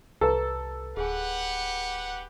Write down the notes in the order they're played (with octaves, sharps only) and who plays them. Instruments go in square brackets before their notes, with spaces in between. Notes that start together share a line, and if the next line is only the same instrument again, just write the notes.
[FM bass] C2 [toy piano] G4 B4 A#5 [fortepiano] A4
[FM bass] D1 [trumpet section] G4 B4 F#5 [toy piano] G#4 G#5